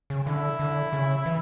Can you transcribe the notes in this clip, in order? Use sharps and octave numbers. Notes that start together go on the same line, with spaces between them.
C#3
D3 E4
D3
C#3
E3